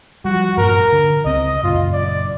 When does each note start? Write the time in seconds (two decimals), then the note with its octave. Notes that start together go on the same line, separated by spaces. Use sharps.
0.25 F3 G3 F#4
0.57 G2 A#2 A#4
0.93 D3
1.25 C#2 C4 D#5
1.63 F#2 A#2 C#3 F4
1.93 D5